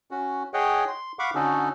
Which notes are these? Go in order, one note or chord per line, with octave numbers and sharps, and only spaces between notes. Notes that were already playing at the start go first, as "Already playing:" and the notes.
C#4 F#4
G#4 C#5 D#5 F#5 G5
C6
F5 F#5 B5 C#6 D6
D3 C#4 D#4 F#4 A4